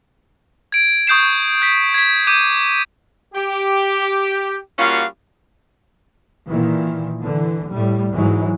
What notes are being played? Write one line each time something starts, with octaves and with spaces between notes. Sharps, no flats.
G#6 D7
C#6 D#6 G6 C7 E7
G6 B6
G#6 B6
D6 G6 D#7
G4
G3 A#3 C#4 F4 F#4 F5
A#2 D#3 E3
D3 E3
A2 G3
G#2 E3 F#3 G#3